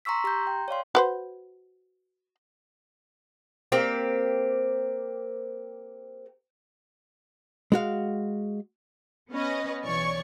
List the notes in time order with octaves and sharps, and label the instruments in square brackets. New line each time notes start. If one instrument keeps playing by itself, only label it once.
[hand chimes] A#5 C6 C#6 E6 B6
G4 A#5 C6 G6
G5
C#5 D5 F5 C6
[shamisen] F#4 B4 C5
[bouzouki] A#3 C4 G4
[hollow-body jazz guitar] G#3 F#4 F5
[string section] B3 C#4 B4 D#5
B1 E3 C#5 D5 C#6